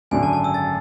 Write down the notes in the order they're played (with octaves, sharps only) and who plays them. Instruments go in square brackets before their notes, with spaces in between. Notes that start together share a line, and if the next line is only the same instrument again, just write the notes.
[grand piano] G#1 F#2 D3 A3 [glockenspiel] G#5
[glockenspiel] A5
A5
E6
A6